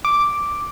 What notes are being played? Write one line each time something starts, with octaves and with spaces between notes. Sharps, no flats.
D6